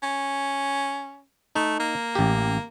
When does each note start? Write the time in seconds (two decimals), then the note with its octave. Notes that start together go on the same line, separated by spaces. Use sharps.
0.03 C#4
1.55 A3 D#4
1.80 A#3
2.15 A1 G4